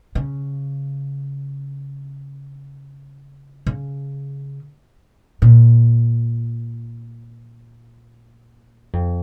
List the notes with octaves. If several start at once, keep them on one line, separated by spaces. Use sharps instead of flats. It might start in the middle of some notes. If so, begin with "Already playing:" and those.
C#3
C#3
A#2
F2